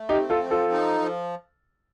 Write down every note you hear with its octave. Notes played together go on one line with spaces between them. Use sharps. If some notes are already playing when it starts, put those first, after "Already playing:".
Already playing: A3
D#4 G4
C4
F4 A4
F3
F4 A4
D#4
F3